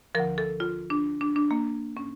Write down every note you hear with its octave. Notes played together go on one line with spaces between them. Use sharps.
D2 D3 F3 A#4
A4
F4
D4
D4
D4
A#3
A2 C#4